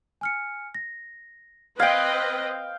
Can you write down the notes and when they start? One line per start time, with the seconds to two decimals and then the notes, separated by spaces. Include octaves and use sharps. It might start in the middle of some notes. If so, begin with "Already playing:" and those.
0.21 G#5 F6 C#7
0.75 A#6
1.80 C4 B4 D#5 F5 G5 G#6 C7 D7